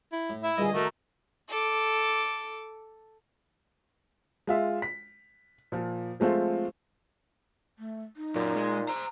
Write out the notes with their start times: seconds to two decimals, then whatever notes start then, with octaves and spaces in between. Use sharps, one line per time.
0.13 E4
0.30 A2
0.44 E4 E5
0.58 G2 A#2 D3 G#4 D#5
0.74 D#3 A3 F#4 A#4
1.49 A4 D6
4.47 G#3 F4 E5
4.82 B6
5.72 A#2 F3
6.20 F3 G#3 A3 C4 F4
7.79 A3
8.16 D#4
8.35 F#2 A#2
8.56 G#3
8.89 C5 A#5